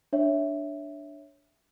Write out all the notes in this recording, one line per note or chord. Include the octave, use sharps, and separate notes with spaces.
D4 C#5 E5